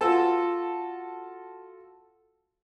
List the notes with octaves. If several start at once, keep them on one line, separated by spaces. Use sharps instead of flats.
F4 F#4 A4 A5